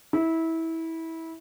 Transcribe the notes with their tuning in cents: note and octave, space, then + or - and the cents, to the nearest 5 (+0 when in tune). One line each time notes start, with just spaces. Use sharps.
E4 -20